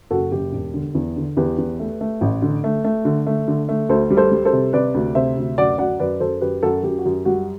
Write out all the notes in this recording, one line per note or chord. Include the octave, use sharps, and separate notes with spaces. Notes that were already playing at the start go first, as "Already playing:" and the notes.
F#1 F#4 A4
F#1 G4
E1
D3
E2
D3
E2 G4 B4
E2
A3
A3
A1
D3
A3
A3
D3
A3
D3
A3
D2 A4 C5
G3
A4 C5
G3
A4 C5
C3
C3 B4 D5
D2
C3 C5 E5
D2
F#2 D5 F#5
F#3 D5 F#5
F#2 B4 D5
F#2 A4 C5
F#2 G4 B4
F#2 F#4 A4
F#2 G4
F#4
F#2 G4
G3 F#4